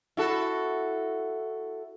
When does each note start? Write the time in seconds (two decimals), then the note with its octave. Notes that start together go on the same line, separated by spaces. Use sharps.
0.17 E4 F#4 A4